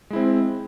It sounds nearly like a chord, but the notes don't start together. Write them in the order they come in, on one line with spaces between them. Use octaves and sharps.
G#3 E4 C4